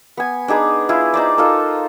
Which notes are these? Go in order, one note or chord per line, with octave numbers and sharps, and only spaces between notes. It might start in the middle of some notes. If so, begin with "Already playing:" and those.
B3 G#5
D4 D#4 G#4 B4
E4 F4 G#4
D#4 C5 D5
D#4 F4 A4 A#4